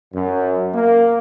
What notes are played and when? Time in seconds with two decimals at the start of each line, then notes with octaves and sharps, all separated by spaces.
0.14 F#2
0.73 A#3